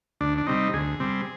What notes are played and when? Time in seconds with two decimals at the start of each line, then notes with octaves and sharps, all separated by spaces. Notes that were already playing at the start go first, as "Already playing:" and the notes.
0.21 D2 D4
0.38 D4
0.47 C3 G3 C4 D#4
0.73 D2 G#4
1.00 C3 G3 C4